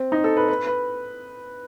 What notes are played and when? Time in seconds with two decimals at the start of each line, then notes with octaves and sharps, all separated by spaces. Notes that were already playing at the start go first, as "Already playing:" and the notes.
Already playing: C4
0.12 D#4
0.24 A4
0.37 B4
0.48 B4
0.67 B4